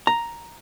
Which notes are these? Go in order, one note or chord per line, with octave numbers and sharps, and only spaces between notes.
A#5